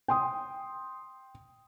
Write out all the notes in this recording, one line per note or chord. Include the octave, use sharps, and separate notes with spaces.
G5 C6 D#6